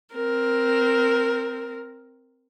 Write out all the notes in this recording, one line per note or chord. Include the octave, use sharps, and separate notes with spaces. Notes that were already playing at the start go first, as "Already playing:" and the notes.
C4 A#4